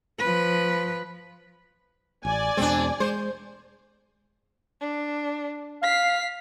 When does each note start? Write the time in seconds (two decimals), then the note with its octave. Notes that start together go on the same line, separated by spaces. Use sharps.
0.19 F3 B4
2.25 A1 D5 G#5
2.57 E2 B2 G#3 C4 D4
3.00 G#3 C5
4.81 D4
5.83 F5 B6 C7